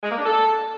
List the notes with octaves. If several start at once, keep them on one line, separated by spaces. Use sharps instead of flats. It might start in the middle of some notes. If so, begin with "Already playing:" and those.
G#3
A#3
D4
A4